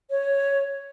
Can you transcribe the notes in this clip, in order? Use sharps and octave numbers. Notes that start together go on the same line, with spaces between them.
C#5